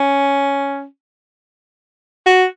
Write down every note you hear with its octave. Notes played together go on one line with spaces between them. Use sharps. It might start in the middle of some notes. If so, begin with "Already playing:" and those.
Already playing: C#4
F#4